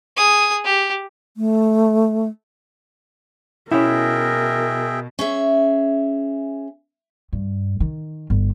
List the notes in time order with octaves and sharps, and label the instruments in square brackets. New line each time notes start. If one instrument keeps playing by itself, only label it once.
[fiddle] G#4 D#6
G4
[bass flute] A3
[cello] B2 [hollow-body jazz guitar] C#4 E4 [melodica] G#4 E5 G5 [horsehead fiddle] A#4
[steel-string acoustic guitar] C#4 G#4 E5
[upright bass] G2
D#3
G1